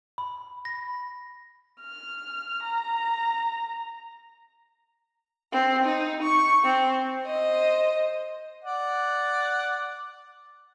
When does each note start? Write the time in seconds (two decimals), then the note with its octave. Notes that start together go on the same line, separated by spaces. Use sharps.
0.18 B5
0.65 A#6
1.81 F6
2.63 A#5
5.52 C4
5.85 D#4
6.23 C#6
6.64 C4
7.25 C5 D#5
8.64 D5 F#5